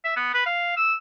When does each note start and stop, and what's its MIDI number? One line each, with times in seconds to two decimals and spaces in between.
0.05 0.16 76
0.17 0.29 59
0.34 0.44 71
0.46 0.72 77
0.77 0.94 88